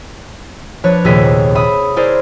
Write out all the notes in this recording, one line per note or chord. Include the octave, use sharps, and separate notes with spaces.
F3 D4 B4 C#5
F1 D#2 A#2 G#4 B6
E5 B5 D#6
E4 G#4 A#4 C5 D5